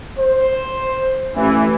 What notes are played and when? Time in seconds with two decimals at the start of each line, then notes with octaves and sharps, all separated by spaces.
0.18 C5
1.35 A1 E3